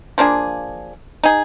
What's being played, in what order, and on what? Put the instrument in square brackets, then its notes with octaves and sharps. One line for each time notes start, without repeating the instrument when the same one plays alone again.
[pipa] F3 A#3 D4 G#4
D#4 G#4